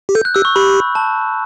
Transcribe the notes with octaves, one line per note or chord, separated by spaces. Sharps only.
G4
A4 G6
F#6
G4 E6
C#6
G4 B5
A5